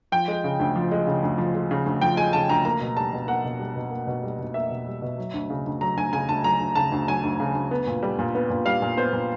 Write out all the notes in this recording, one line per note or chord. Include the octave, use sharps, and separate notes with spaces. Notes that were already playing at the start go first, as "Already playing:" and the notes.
F3 G5
G#3
C#3
D2
F3
G#3
C#3
D2
F3
G#3
C#3
D2
F3 G5
G#3 G#5
C#3 A5
D2 A#5
A#3 A#5
B2
G3 A5
B2
A#3 F#5
B2
G3
B2
A#3
B2
G3
B2
A#3 E5
B2
G3
B2
F#3
D2
C#3
D2
F#3 A#5
D2 G#5
C#3 G#5
D2 A5
F#3 A#5
D2
C#3 A5
D2
F#3 G#5
D2
C#3
D2
B3
A#2
G3
A#2
B3
A#2
G3 F5
A#2
B3 C5
A#2